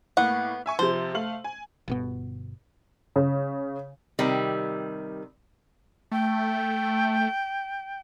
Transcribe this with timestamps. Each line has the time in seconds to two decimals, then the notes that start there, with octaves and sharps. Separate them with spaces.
0.17 A2 A#3 B3 F#5
0.66 E5 G#5 C#6
0.79 C3 F3 C5
1.14 A3 F5 F#7
1.44 G#5
1.88 G1 B2 B3
3.16 C#3
4.19 C3 D#3 G3
6.12 A3 G5